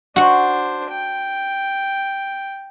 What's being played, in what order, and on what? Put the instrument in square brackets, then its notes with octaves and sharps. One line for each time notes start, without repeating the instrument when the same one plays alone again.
[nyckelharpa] D4 C5 [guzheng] F#4 F#5
[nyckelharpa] G5